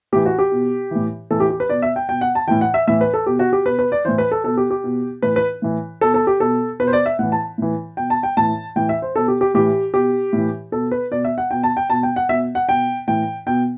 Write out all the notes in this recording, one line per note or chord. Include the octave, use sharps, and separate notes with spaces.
A2 E3 G4
F#4
G4
B2
A2 E3
A2 E3 A4
G4
G4
B4
B2 D5
E5
G5
B2 G5
F#5
A5
A2 E3 G5
F#5
E5
A2 E3 E5
B4
A4
B2 G4
F#4
G4
B2 B4
B4
D5
A2 E3 C5
B4
A4
B2 A4
G4
G4
B2
A2 E3 B4
B4
A2 E3
B2 A4
A4
G4
B2 A4
B2 B4
C5
D5
E5
A2 E3 F#5
A5
A2 E3
B2 G5
A5
G5
A2 E3 A5
A2 E3 G5
E5
C5
B2 A4
G4
G4
A2 E3 G4
B2 G4
A2 E3
B2 A4
B4
B2 D5
E5
F#5
B2 G5
A5
G5
B2 A5
G5
F#5
B2 E5
F#5
B2 G5
A2 E3 G5
B2 G5